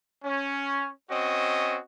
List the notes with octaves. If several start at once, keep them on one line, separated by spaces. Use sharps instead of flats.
C#4
C4 C#4 F#4 D#5